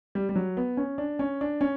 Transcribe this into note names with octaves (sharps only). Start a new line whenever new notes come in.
G3
G3
F#3
B3
C#4
D4
C#4
D4
C#4